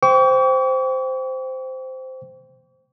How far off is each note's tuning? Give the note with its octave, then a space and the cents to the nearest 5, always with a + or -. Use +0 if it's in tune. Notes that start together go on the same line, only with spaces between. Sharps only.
C5 -10 G5 +0 C#6 +45